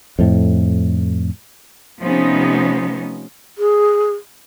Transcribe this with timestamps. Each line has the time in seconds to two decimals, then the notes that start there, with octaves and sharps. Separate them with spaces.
0.19 F2 A2
2.01 C3 F3 A3 B3 C#4 D#4
3.58 G#4